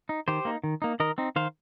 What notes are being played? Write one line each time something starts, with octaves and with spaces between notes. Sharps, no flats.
D#4
D#3 G4 C5
A#3 D#4
D#3
A#3 D#4
D#3 A#4 D#5
C4 D#4
D#3 C5 F5